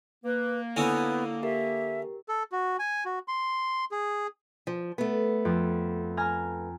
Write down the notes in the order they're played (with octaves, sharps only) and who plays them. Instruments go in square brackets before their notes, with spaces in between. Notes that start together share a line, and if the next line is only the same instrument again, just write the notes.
[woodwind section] A#3 [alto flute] B4
[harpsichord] D3 C#4 D#4 [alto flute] B3 [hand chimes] E4 E6
[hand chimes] G4 A#4 [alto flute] E5
[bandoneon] A4
F#4
G#5
F#4
C6
G#4
[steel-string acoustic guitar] F3
A3 B3
[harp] F2
G#5 A#5 F6